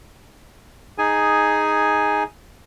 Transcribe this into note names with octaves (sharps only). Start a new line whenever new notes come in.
D#4 G#4 G#5